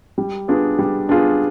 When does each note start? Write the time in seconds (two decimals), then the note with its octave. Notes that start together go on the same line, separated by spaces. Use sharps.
0.18 G3
0.48 B3 D4 F4 G#4
0.79 G3
1.09 B3 D4 F4 G#4